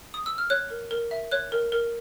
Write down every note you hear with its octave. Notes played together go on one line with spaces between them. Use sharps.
D#6
E6
F6
C#5 F#6
A#4
A#4
E5
C#5 F#6
A#4
A#4